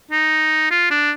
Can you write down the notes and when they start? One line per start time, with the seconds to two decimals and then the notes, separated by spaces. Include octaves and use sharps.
0.11 D#4
0.71 F4
0.90 D4